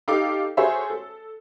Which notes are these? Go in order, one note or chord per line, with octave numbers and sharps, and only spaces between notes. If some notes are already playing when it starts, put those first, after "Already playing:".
D#4 G4 A4 F5 D6
F#4 G#4 A4 C5 C#5 E5
A4